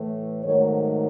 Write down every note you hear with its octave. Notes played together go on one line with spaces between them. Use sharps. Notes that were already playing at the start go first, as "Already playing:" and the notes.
Already playing: A2 E3 A3
G#2 D#3 F#3 A3 C#5